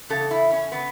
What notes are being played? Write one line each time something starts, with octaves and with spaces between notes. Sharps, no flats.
E2 C#3 A4
E4
C#4
C#3 B3